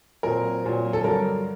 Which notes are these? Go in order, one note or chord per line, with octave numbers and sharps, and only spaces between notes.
A#2 F#3 C4 A#4
A#2 F#3 C4
A4
G2 D3 F#3 A#4